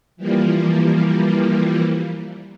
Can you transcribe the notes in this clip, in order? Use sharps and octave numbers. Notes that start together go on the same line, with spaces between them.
E3 F3 G3 A#3